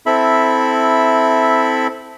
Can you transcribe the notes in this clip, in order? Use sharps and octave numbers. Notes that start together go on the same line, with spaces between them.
C4 E4 A4 E5 B5